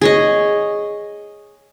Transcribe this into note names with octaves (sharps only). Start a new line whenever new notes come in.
G#4 C#5 D#5